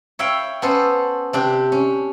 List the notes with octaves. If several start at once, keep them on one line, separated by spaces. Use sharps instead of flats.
C#5 E5 F5 G5 B5
B3 C#4 A4 C5
C3 D4 G4
C#4